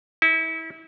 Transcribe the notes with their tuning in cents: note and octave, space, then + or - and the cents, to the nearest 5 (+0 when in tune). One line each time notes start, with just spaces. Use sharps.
E4 -30